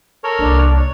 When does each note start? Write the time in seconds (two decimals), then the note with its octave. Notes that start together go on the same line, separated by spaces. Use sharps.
0.24 A4 A#4 C#5
0.39 C2 A#3 D4
0.76 C#5